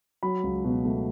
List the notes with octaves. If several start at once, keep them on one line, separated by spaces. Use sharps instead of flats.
F#3 B5
C#2
B2
A3